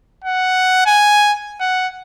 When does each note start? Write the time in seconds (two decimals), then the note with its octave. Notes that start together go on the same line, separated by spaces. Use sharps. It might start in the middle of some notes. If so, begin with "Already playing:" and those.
0.25 F#5
0.86 G#5
1.61 F#5